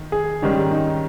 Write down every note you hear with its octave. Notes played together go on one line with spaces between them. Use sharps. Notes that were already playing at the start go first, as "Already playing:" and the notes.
Already playing: D#3
G#4
G#2 D#3 G3 C#4 D#4
D#4